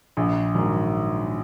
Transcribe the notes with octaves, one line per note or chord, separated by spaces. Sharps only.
A#1
G#2 D#3 F#3